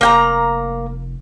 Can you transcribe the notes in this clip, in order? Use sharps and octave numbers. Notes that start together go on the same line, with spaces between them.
F1 A#3 G5 A#5